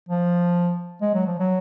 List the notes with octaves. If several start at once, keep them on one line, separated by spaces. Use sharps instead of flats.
F3
G#3
F#3
F3
F#3